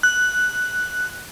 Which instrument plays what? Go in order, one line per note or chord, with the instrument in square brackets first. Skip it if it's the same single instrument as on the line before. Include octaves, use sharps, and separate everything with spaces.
[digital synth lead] F#6